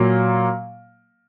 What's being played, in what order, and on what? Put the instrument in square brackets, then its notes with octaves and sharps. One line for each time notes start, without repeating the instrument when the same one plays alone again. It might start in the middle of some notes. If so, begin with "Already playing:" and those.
Already playing: [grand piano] A#2 F#3 A#3